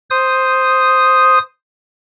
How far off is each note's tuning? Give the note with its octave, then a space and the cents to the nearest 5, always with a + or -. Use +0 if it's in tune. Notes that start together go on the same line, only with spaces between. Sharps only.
C5 +0 D#6 +0